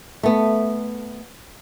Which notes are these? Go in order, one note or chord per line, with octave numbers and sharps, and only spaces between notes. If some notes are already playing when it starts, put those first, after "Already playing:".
A3 B3